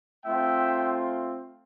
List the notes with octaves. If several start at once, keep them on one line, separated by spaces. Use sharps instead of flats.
A3 C4 F4 E5 G5